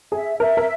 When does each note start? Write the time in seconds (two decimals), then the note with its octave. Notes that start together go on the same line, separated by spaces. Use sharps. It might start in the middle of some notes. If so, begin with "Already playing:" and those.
0.12 G#4 E5
0.40 A#4 E5
0.57 A#4